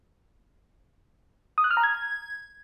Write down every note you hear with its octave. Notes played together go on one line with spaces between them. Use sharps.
D#6
F#6
F6
A#5
G#6